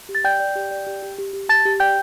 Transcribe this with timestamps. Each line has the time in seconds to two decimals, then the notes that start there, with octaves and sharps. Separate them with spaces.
0.09 G4
0.15 A6
0.24 D5 G5 G6
0.40 D5
0.55 G4
0.71 D5
0.87 G4
1.03 G4
1.19 G4
1.33 G4
1.49 G4 A5 A6
1.65 G4
1.80 D5 G5 G6